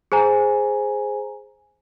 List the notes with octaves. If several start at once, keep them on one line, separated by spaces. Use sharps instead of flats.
G#4 C5 G#5 A#5